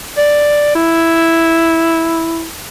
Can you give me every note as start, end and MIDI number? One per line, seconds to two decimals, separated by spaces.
0.18 0.73 74
0.75 2.48 64